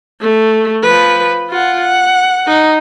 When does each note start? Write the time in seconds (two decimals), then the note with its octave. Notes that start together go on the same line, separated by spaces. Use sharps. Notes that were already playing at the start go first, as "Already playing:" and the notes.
0.21 A3
0.83 F3 B4
1.50 F4 F#5
1.81 F#5
2.47 D#4